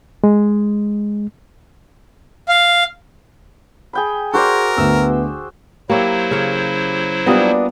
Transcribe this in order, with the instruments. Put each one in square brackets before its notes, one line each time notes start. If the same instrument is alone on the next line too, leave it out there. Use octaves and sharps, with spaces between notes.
[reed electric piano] G#3
[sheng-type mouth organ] F5
[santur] G#4 G5 B5
[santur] F#4 C5 D5 [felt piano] G#4 [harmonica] A#4
[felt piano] D2 [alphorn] B3 [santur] E6
[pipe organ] F#3 E4 C5 [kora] A#3 C#5 E5 [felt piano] G4
[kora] C#3 C#5
[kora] G3 A#3 D#5 [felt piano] B3 F4 D#6 [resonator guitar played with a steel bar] D4 F#4